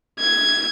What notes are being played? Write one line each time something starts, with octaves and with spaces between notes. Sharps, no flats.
G#6